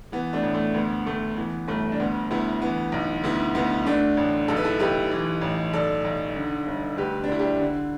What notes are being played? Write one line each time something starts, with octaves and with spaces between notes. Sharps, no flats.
E3 B3
A3 D4
A1
A3
D2 B3
D2 A3
E3 B3
G1 A3
D4
D2 B3
D2 B3 E4
E3 B3
B1
D2 B3 E4
D2 B3
D3 A3 D4
A1
B1 A4
B4
E4 A4
B1 G4 B4
E3
A1
B1 A4 D5
B1
D3
G1
D2 G4 B4
D4
D2 E4
D4 G4
D3